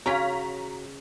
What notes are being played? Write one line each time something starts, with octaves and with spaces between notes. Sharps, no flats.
C#3 C#4 F4 F#4 C#5 A#5 B6